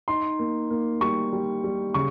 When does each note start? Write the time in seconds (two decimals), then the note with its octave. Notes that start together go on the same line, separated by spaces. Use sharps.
0.08 D#4 C6
0.39 A#3
0.70 A#3
1.01 G3 C#6
1.33 G3
1.64 G3
1.94 C#3 C#6